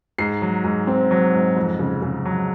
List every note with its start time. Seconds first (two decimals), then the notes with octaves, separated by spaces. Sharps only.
0.18 G#2 C7
0.42 F#3
0.64 G#2
0.87 C4
1.11 F#3
1.34 G#2
1.56 F2
1.79 C#3
2.02 C#3
2.25 F#3